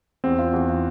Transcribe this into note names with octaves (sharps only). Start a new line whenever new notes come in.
E2 C4
F4
E2
F4